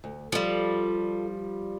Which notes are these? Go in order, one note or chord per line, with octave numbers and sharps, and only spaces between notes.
D2
F3 G3 F4 A4